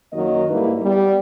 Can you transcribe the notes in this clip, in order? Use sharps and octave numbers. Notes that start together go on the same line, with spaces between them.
F#2 D#3 F#3 A#3 D#4 D#5
G#2 G3 A#3 E4 B4
G3 B3